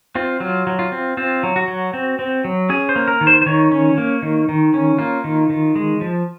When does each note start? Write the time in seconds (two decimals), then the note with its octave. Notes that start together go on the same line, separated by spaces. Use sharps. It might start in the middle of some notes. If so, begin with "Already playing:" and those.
0.15 C4 F4
0.40 F#3 F4
0.67 F#3
0.79 F4
0.92 C4
1.17 C4 F4
1.43 F#3
1.56 F#4
1.68 F#3
1.93 C4
2.19 C4
2.44 F#3
2.69 C#4 G#4
2.89 C5
2.96 A#3
3.08 A#4
3.21 D#3
3.27 C5
3.42 C5
3.46 D#3 C#5
3.72 C#4
3.98 A#3
4.22 D#3
4.49 D#3
4.74 C#4
4.99 A#3 F4
5.24 D#3
5.50 D#3
5.76 G#3
6.01 F3